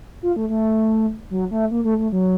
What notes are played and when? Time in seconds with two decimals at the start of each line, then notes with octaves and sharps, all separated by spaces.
0.23 F4
0.36 A3
0.49 A3
1.30 F#3
1.51 A3
1.71 A#3
1.85 A3
1.98 A3
2.12 F#3